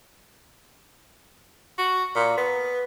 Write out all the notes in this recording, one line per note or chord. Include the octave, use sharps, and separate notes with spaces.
F#4
A#2
B3